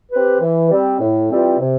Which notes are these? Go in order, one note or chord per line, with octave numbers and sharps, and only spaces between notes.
C4 G4 B4
E3
G3 C4
A2
E3 G3 C4 F4
C3